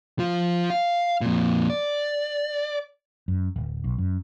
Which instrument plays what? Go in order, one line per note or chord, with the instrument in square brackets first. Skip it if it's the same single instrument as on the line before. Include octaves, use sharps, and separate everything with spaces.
[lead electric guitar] F3 F4
F5
F2 A#2
D5
[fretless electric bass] F#2
D1
B1
F#2